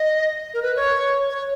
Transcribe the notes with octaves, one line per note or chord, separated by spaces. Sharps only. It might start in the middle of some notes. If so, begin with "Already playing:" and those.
Already playing: D#5
A#4
B4
C#5
C#5